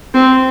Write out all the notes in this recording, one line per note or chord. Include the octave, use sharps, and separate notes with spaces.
C4